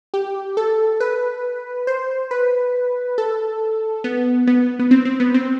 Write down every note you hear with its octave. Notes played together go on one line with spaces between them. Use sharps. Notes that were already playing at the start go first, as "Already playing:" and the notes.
G4
A4
B4
C5
B4
A4
B3
B3
B3
C4
C4
B3
C4